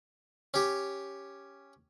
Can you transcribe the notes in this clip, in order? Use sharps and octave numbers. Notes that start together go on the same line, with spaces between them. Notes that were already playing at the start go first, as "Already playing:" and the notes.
C#4 G4